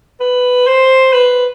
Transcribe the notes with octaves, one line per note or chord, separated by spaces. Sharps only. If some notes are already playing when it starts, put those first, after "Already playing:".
B4
C5
B4